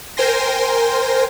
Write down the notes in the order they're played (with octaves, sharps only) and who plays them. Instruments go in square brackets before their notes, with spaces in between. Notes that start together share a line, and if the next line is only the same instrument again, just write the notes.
[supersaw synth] A#4 C5 G5 G#5 C6 A#6